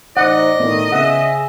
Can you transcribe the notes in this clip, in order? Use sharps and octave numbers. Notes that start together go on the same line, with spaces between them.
A1 D#4 C5 D5 D#5 F#5
A2 D#3 B3
C#3 B3 G#4 E5 F#5